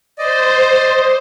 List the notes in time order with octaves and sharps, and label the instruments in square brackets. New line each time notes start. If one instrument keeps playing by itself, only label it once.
[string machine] C5 [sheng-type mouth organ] D5 D#5